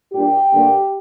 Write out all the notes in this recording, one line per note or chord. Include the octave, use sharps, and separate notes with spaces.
A#2 G3 D4 G4
G2 D3 A#3